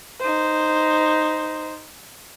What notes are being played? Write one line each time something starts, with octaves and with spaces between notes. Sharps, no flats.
D#4 C5